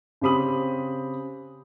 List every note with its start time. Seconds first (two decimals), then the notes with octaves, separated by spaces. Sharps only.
0.21 C#3 C4 G4 B5 D#6 F#7